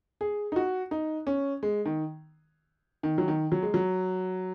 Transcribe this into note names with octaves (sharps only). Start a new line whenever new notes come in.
G#4
D#4
F#4
D#4
C#4
G#3
D#3
D#3
F#3
D#3
F#3
G#3
F#3